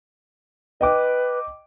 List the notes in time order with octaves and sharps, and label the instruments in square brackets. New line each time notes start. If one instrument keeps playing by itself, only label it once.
[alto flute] B4 [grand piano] D#5 G5 D6